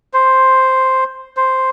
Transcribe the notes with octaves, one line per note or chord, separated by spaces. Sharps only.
C5
C5